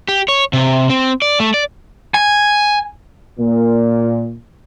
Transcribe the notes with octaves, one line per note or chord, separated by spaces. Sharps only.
G4
C#5
C3
C4
D5
A3
D5
G#5
A#2